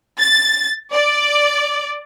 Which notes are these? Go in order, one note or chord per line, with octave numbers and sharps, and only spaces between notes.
A6
D5